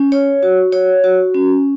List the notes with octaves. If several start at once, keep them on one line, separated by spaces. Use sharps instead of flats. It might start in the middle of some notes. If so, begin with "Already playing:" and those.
Already playing: C#4
C#5
F#4
C#5
F#4
C#4